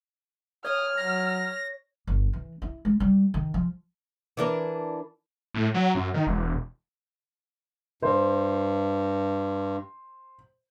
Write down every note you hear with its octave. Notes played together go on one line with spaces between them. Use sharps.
C#5 D#6 F6
F#3 A#6
G1
E3
E4
G#3
G3
D#3
F3
E3 D4 A#4
A2
F#3
F#2
D#3
E1
G2 C5